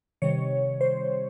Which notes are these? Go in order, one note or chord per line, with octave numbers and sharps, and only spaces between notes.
C3 D#3 G3 C#5
C5